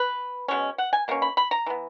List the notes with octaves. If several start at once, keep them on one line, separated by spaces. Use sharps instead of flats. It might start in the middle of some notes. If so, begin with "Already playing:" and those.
Already playing: B4
B2 G#3 C#4
F#5
G#5
B2 A#3 C#4
B5
B5
A#5
E3 B3